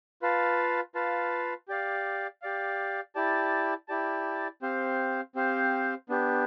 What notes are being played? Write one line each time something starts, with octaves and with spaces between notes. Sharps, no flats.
F4 B4 F5 A5
F4 B4 F5 A5
G4 D5 F5
G4 D5 F5
E4 G4 D5 A5
E4 G4 D5 A5
C4 G4 C5 F5
C4 G4 C5 F5
B3 D4 G4